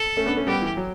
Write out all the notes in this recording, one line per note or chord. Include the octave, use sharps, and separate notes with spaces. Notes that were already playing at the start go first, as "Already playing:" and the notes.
Already playing: A4
A3 C#4
B3 D4
A3 C#4
G3 B3 G4
E3
F#3